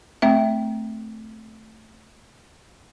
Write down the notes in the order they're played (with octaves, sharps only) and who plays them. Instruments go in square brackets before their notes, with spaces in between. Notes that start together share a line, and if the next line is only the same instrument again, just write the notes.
[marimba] A3 C4 E5